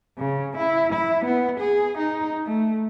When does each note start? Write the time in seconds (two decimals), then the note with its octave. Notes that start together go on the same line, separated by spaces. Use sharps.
0.18 C#3
0.58 E4
0.93 E4
1.25 B3
1.60 G#4
1.98 D#4
2.45 A3